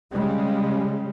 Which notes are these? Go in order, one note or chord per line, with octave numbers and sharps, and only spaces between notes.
C#3 G3 G#3